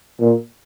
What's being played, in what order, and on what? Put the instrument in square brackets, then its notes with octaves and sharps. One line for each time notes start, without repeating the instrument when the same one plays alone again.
[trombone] A#2